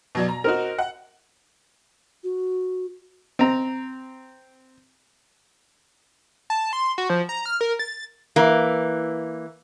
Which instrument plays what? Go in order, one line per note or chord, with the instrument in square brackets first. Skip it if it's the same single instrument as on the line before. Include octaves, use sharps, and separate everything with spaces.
[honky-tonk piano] B2 F#3 D5
A#5
[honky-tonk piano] C4 D#4 F#4 [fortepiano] A#4
[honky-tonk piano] F#5
[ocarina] F#4
[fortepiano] C4 A#5
[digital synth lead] A5
C6
F#4
F3
A#5
F6
A#4
A6
[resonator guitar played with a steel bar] E3 A#3